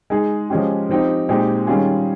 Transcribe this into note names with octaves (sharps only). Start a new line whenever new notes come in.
G#3 D#4 G#4
F3 G#3 C#4 G4
F3 C4 D#4 G4
A#2 G#3 C4 D#4 G4
D#3 G3 C#4 F4 G#4